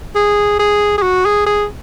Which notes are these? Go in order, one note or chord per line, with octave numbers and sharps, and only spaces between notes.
G#4
G#4
G#4
F#4
G#4
G#4